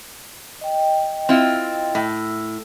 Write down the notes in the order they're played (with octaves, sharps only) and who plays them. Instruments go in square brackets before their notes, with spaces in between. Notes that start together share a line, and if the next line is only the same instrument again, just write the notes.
[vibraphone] D#5 G5
[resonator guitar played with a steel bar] C4 E4 F4
A2